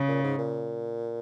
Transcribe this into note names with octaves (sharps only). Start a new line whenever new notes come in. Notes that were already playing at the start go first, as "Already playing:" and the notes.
Already playing: C#3
A#2
G#2
A#2